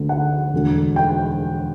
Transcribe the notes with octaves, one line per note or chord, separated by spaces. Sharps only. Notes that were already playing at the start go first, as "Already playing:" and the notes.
Already playing: D2 D3
F#5
E1 D2 D3
G5